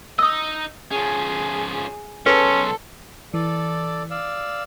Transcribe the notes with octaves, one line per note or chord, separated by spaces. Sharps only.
D#4 D#5 D#6 E6
F3 C#4 G#4
B1 C#4 G#4 A4 B4 C6
E3 A4 D5
D5 F5 E6